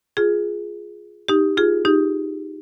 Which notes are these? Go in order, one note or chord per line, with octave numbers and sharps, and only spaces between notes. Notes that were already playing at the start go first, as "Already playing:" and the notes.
F4 G#4
D#4 G4
F4 G#4
D#4 G4